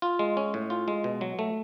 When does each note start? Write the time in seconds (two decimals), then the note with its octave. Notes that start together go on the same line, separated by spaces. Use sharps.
0.02 F4
0.19 G#3
0.37 C#4
0.54 A2
0.70 F4
0.88 G#3
1.04 B2
1.21 F#3
1.39 A3